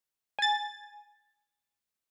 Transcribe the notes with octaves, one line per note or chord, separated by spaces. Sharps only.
G#5 A6